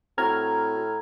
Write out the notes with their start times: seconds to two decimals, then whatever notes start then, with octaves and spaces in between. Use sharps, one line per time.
0.18 A2 C4 F#4 A#5 F6 G#6